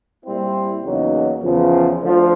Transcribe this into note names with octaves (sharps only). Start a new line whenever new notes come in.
A#2 G3 C4 E4
E2 C#3 F#3 A#3 D#4
E2 C#3 F3
D2 D3 F3